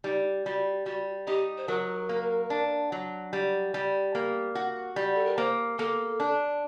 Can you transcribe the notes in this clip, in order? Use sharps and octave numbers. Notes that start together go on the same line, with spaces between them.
G3 D#4
G3 F#4
G3 F#4
D#4 G4
C5
F#3 A#4
A#3
D4
F#3
G3
G3
A#3
F#4
G3 D5
A4
A#4
A#3 C5
A#3 A4
D4